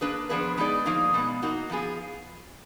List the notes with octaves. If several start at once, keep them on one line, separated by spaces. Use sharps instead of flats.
A#3 D4 G#4 B4
F3 B3 D4 G#4 B4
G#3 B3 D#4 G#4 D5
F3 A#3 D#4 G#4
B2 G#3 B3
A#3 D#4 F#4
F3 B3 F4 G#4